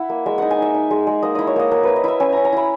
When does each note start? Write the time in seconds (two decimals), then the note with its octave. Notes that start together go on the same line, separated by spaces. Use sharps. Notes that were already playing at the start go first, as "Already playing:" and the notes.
Already playing: E4 E5 F#5
0.10 A#3
0.26 G#3 E5
0.38 D#4 F#5
0.51 G#5
0.58 D#4 E5
0.74 D#4
0.91 G#3
1.07 G#3
1.22 A#3 D#5
1.35 E4 D#5
1.47 C#5
1.56 A#3 D#5
1.71 E4 A#4
1.83 E4 B4
1.96 D#5
2.04 E4 E5
2.20 C#4 G#5
2.32 C#4 A#5
2.45 A#5
2.53 E4 B5